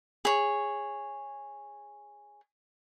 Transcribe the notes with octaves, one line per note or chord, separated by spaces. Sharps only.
G#4 C#5